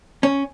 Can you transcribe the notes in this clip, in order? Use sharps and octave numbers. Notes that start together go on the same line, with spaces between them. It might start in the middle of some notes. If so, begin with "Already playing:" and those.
C#4